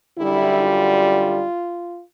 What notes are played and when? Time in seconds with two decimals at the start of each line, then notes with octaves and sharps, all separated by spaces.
0.18 F#2 D3 G3 E4
0.63 F4